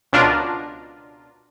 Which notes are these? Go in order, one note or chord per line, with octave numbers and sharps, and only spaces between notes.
C#2 B2 D4 F4 A#4